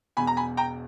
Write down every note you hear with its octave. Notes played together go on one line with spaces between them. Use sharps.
E1 E2 B2 G#5 B5
A#5
G#5 B5
G5 A#5